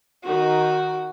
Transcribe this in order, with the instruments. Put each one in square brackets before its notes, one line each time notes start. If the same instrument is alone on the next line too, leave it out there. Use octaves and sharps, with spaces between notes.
[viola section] D#3 D#4 [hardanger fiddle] F#4